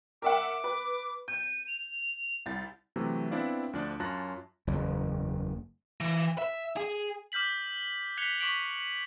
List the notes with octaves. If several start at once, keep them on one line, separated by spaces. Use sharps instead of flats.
A#4 E5 F#5 D6
B4
G6 D#7
F7
C2 A6
C3 E3 F#3 A3
B3 C4 D4 E4 D5 F5
D2 F3 D4 D5
F#2 C#4 F4 A5 F#6 A#6
F#1 E2
E3
E5
G#4
D6 F6 G6 B6 F#7
F#6 G#6 B6 C#7 F7 G7
C#6 D6 B6 D7 F#7